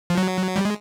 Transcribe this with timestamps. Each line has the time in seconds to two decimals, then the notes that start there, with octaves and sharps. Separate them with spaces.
0.10 F3
0.18 F#3
0.56 G3
0.65 G#3